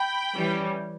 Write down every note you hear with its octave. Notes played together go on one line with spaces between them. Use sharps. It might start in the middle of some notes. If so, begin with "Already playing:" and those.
Already playing: G5 B5
E3 G3 C#4